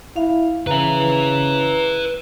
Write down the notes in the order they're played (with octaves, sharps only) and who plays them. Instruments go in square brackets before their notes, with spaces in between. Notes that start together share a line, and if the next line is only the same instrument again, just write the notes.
[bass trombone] E4 [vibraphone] F5
[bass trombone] C#3 [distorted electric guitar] B4 E5 [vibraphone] A#5